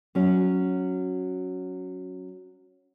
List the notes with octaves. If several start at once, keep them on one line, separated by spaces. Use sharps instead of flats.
F#3 C#4